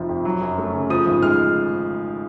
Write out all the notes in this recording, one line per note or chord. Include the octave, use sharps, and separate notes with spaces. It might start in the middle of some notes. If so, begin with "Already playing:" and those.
Already playing: F1 C3 F3
F2
F#3
F#2
A3
C#3
F3 D#6
G#1
G#3 F6